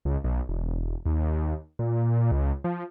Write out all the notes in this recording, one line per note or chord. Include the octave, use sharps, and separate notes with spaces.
C#2
B1
E1
D#2
A#2
C#2
F3